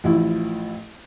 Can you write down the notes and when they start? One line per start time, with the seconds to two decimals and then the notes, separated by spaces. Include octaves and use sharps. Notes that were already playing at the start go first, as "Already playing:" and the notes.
0.04 A1 F3 E4